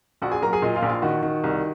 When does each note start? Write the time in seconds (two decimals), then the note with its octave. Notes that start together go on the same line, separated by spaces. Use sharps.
0.22 A#1 F#4 F#5
0.32 G#4 G#5
0.42 F#3 A#4 A#5
0.53 G#4 G#5
0.62 A#2 D#5
0.76 F4 F5
0.82 A#1
0.89 F4 F5
1.02 D#3 F#4 F#5
1.22 D#3
1.44 C2